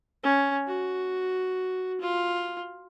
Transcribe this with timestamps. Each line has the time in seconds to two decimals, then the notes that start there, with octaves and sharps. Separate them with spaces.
0.24 C#4
0.67 F#4
2.01 F4